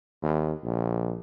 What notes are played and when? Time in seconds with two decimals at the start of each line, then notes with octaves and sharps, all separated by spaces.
0.23 D#2
0.64 A#1